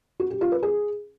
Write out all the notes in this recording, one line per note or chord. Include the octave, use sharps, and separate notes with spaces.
F#4
G4
F4
B4
G#4